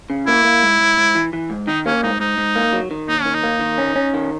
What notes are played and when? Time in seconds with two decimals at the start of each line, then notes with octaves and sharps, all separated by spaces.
0.10 C#3
0.27 A#3 E4
0.45 A#3
0.63 G#2
0.80 G#2
0.97 G#2
1.15 E3
1.33 E3
1.50 G#2
1.67 D#3 D#4
1.86 A#3 C#4
2.03 G#2 D#4
2.20 G#2 D#4
2.38 G#2
2.56 A#3
2.73 F#3
2.91 D#3
3.08 D#2 D#4
3.22 D#3 C#4
3.34 D#4
3.43 A#3
3.60 D#3
3.78 C#4
3.96 C#4
4.14 D#3